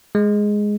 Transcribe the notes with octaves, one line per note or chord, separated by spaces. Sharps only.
G#3